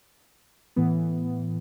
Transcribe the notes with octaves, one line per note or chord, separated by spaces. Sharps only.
A2 E3 B3